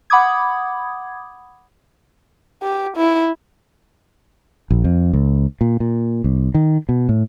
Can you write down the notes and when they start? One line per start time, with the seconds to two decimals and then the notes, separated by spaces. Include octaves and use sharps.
0.10 F#5 B5 D6 D#6 G#6
2.63 G4
2.96 E4
4.70 A#1
4.84 F2
5.13 C#2
5.61 A#2
5.80 A#2
6.24 C2
6.54 D#3
6.89 B2
7.09 A2